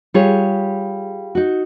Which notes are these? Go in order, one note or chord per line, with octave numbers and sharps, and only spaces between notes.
G3 F4 G#4 C#5
D#4 F#4